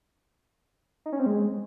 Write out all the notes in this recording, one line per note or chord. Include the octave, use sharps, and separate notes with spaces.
D#4
C#4
C4
G#3